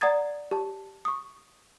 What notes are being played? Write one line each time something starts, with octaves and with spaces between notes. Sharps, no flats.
D5 F#5 A#5 D#6 G#6 A6
G4 A5
C#6 D#6